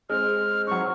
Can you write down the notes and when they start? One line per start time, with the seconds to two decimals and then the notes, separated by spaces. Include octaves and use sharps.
0.10 G#3 C4 F6
0.67 F#3 C4 C#6